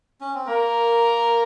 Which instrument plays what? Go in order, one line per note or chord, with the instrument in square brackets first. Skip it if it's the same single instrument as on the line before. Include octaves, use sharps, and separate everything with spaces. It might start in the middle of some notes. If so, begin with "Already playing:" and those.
[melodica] C#4
C4
[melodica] A#3 [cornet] A#4